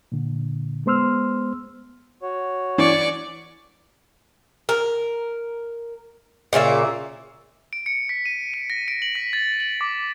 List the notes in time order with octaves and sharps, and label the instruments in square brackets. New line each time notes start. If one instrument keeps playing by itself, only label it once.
[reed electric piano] A#2 D3
G#3 B3 C5 C6 E6 F6
[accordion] F#4 C#5
[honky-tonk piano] E3 [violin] D5 C#6
[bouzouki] A#4
A#2 C#3 A#3 E5
[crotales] D7
C#7
B6
D#7
D#7
A#6
D7
F#7
B6
A6
F#7
D6